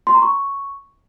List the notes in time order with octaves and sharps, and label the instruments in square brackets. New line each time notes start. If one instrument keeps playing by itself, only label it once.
[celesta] C6
A#5
C#6